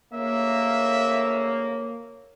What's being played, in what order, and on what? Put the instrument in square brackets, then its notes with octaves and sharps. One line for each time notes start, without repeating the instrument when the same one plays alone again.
[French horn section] D2 C#3 C#5 [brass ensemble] A#3 [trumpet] E5